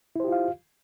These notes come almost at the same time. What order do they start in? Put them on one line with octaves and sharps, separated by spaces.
E4 C5 G4 F4 F5